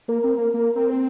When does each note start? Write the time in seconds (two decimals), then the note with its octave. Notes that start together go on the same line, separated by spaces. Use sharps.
0.08 A#3 A#4
0.24 C4
0.38 A#3
0.54 A#3
0.76 C4